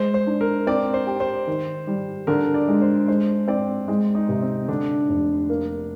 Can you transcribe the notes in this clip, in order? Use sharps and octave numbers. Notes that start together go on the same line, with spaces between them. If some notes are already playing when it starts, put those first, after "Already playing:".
Already playing: G#3 C5
C5
D4
A#4
C4 D5
C5
G4
C5
D#3
G3
D3 A#4
D5
G#3
C5
G#3 C5
C4 D5
G#3
D#4
C3
C4
D3 D4
F1
A#3